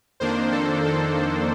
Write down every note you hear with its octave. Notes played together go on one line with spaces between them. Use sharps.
F2 D#3 A#3 D4 C5
A4
A4
A4